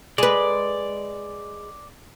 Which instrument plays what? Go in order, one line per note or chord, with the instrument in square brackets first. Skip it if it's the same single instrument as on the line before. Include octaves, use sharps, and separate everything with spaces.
[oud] G#3 B4 [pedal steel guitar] D5